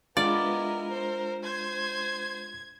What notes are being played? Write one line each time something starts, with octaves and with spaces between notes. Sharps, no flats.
G#3 B3 D4 E4 F4 A#4 D5 D#5
C5
C5 G#6